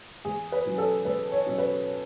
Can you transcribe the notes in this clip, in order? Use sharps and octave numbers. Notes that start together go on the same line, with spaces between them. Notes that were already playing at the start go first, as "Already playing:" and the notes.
E2 G#4
B4
B2 F#3 C#4
A4
E2 B4
C#5
B2 F#3 C#4
B4